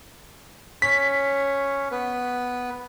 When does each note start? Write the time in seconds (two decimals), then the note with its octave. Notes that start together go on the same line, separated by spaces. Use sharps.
0.82 C#4 C#5 B6
1.91 B3 B4